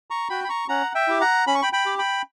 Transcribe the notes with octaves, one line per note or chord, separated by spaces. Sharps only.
A#5 C#6
F#4 G5 B5
B5
A#5 C#6
C#4 F#5 A#5
E5 G5
E4 G4
F#5 A#5
C#4 B5
C#6
G5 B5
G5 B5
G4
G5 B5